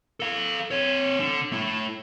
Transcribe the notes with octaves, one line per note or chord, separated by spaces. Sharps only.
A4 F5
C4 C#5
D3
A3 E4